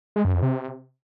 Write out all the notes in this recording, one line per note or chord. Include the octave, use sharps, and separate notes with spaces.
G#3
F#2
F2
C3